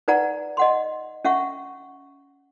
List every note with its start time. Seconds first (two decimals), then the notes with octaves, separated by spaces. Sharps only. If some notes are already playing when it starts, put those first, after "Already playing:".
0.08 D#4 B4 D5 F#5 A#5
0.57 D#5 F#5 C6
1.25 C#4 E5 F#5 C#6